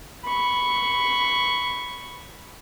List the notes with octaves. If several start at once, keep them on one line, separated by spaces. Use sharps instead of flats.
B5 C#6